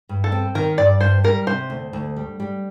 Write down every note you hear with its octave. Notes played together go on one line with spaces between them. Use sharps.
G2
A4
C4
D#3 A#4
G2 D5
G2 C5
G3 A#4
C3 C5
D2
D2
G3
G3